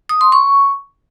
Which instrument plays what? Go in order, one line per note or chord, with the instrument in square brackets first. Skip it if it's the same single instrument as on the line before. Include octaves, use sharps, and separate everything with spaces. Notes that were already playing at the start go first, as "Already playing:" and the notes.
[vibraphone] D#6
C6
C#6